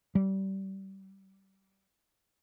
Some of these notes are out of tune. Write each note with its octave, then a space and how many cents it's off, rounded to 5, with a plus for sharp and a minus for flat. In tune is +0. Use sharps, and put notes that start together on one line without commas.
G3 -25